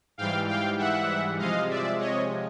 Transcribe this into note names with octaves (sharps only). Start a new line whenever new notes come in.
G#2 E3 G3 F5 G5
F5 G5
E5 F#5
C3 F3 G#3 D#5 F5
D5 E5
C#5 D#5